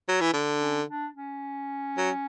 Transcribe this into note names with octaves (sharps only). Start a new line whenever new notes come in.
F#3
E3
D3 D4
C#4
D4
C#4
F#3